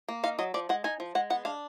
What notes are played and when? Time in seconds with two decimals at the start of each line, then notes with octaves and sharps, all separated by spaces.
0.08 A#3
0.23 D#4 F5
0.39 F#3 D#5
0.54 F3 D5
0.69 G#3 F#5
0.84 D#4 G#5
1.00 F3
1.15 G#3 F#5
1.30 B3 F#5
1.45 D4 F5